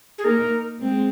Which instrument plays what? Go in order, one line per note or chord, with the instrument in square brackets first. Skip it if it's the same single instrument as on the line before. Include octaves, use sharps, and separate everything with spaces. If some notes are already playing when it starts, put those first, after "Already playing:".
[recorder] G#4
[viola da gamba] A#3 D#4 [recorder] A#4
[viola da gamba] G#3 C4